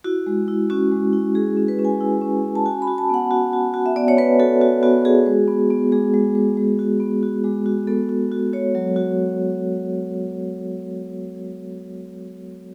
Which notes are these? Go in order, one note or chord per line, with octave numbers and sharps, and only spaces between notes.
E4 F#4
G#3
E4
C#4 F#4
G#3
E4
G#3 G#4
C#4
B4
C#4
G#5
E4
C#4
C#4
A5
F#4 G#5
B5
F#4
A5
B3 F#5
F#4
F#4
F#4
E5
B3 D5
C#5
B3 B4
F#4 A4
F#4
B3 F#4
F#4 G#4
G#3
B3
B3
G#3 G#4
G#3
G#3
G#3
F#4
B3
F#4
G#3
F#4
B3 A4
F#4
F#4
F#4 C#5
F#3
F#4